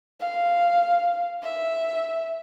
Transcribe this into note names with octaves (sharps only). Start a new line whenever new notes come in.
F5
E5